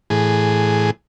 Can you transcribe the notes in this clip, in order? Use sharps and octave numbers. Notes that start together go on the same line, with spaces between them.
A2 E3 G#4